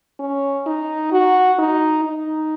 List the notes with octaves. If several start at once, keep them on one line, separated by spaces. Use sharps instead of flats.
C#4
D#4
F#4
D#4
D#4